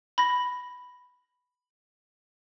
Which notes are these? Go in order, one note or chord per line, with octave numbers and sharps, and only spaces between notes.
B5 A#6